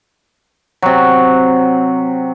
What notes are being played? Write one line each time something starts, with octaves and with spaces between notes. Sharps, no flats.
C3 F#3